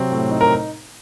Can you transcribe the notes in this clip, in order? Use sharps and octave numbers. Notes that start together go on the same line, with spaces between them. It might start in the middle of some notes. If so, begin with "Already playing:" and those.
Already playing: C3 F#3 C4
A2
D#4
A#4